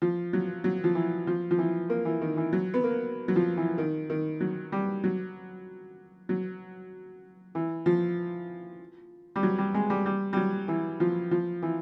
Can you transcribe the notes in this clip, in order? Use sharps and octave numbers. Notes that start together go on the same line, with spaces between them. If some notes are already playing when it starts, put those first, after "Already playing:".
F3
F#3
F#3
F3
E3
F3
F3
E3
A#3
E3
D#3
E3
F#3
B3
A#3
F#3
F3
E3
D#3
D#3
F#3
G3
F#3
F#3
E3
F3
G3
F#3
G3
G#3
G3
G3
G3
F#3
E3
F3
F3
E3